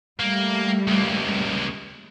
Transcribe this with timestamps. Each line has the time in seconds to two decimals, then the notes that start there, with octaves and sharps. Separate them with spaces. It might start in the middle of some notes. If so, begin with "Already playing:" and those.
0.20 G3 A3 A#3
0.88 C#2 A#3